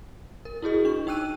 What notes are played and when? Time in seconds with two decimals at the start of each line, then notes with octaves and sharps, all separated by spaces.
0.45 A#4
0.62 E4 F#4 G#4 D#5
0.85 D4 C#6
1.07 D#4 G5 E6 F#6 D#7